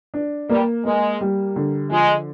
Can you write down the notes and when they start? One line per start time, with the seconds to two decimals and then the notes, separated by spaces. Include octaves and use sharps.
0.14 D4
0.50 G3 A#3
0.85 G#3 A#3
1.21 G3
1.56 D3
1.91 F3 G#3